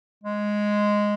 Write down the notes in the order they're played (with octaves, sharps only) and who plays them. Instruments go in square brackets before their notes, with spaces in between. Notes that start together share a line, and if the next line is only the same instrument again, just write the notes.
[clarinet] G#3